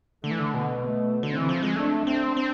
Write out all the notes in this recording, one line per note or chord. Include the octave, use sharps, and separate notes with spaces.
D3 A3
E3
D3
B2 B3
A3
D3
C4
E3
F3
G#3
A3 D4
C4
D4
C4